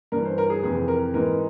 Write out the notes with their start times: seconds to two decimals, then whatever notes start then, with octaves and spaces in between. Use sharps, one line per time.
0.12 G2 E3 A#4
0.25 C5
0.38 A#4
0.50 G#4
0.62 F2 C3 E3 G#4
0.88 A#4
1.14 G#2 E3 A#4